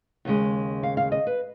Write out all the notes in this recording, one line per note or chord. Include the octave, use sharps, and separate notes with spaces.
D#2 C#3 G#3
F5
F5
D#5
B4